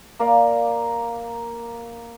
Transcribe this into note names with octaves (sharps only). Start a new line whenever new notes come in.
A#3 A#4 D5 F5